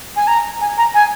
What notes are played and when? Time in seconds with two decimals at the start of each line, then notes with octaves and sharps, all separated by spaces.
0.16 G#5
0.27 A#5
0.61 G#5
0.78 A#5
0.94 G#5